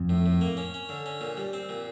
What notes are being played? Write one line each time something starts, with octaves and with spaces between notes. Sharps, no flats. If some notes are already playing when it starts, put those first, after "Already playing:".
Already playing: F2
A2
A2
A#3
C#4
C#4
D3
C#4
A#2
G3
C4
A#2